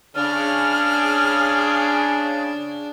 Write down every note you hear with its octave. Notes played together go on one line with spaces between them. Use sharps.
C#3 D4 G#4 F6